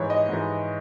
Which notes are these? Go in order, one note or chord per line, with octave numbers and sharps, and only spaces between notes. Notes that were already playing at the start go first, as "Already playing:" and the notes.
Already playing: G#2 E3 C#5
D#5
G#2 E3